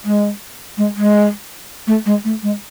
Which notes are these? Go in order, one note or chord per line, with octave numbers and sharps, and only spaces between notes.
G#3
G#3
G#3
A3
G#3
A3
G#3